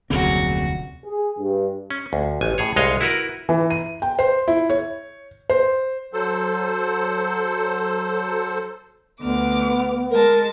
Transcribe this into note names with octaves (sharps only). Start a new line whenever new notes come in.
F1 D2 A#2 C#3 F#3 C4 F#4
G#4
G2
C#4
D2
A1 G#5
A2 G#4 C#5
C2 G#3 C#5 D#5 F5
E4 F#4 A#4 B4
E3
D#7
G5
C5
E4
C#5
C5
F#3 A4 C5
D2 B3 D6 F6
G#3 A#4 A5